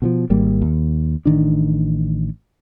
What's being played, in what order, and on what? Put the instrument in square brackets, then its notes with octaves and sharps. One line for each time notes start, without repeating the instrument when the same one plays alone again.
[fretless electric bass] B2 D#3 F3
G#1 G3 A#3
D#2
A1 D#3 D4